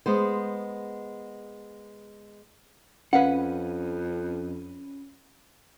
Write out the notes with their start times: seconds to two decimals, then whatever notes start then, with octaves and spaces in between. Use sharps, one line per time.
0.06 G#3 B3 C5
3.13 F2 C#4 B4 F5 F#5 B5 D#7